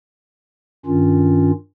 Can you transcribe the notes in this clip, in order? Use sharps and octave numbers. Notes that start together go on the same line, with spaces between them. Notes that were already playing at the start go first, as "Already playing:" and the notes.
G2 D#3 C#4 F4